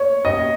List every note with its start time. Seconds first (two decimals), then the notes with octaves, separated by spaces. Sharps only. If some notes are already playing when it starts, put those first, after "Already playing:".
Already playing: C#5
0.25 D#5